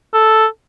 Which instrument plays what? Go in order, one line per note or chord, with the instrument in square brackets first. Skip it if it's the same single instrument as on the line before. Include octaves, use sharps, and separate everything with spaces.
[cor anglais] A4